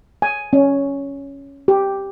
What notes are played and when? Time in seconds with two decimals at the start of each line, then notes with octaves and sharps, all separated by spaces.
0.22 G#5
0.53 C#4
1.68 G4